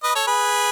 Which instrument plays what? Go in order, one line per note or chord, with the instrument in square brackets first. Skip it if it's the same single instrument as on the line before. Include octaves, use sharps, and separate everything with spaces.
[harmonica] B4 D#5
A4 C#5
G#4 B4